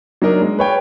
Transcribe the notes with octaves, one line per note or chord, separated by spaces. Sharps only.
F#3 D4 D#4 A#4 D#5
G#3
B4 C#5 G5